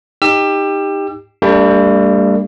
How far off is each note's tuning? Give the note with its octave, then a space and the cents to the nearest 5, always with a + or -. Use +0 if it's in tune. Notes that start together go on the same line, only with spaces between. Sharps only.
D#4 +0 G4 +20 E6 +40
G3 +20 A#3 -45 D4 -15